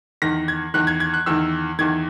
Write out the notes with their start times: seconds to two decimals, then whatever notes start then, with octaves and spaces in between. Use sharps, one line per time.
0.22 E2 D#3 A#6
0.48 G#6
0.74 E2 D#3 F#6
0.87 G#6
1.00 G#6
1.14 F#6
1.26 E2 D#3 E6
1.79 E2 D#3 G#6